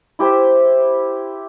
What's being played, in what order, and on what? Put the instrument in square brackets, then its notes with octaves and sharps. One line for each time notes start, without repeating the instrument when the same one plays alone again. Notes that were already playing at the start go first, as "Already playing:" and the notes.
[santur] E4 G4 C5 E5